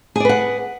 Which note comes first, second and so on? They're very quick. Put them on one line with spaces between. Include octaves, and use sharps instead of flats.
G#4 D5 B4 F#5